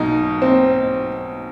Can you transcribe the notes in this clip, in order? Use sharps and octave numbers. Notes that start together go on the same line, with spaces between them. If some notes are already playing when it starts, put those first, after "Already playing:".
Already playing: B1 B2 F#3 D#4
C4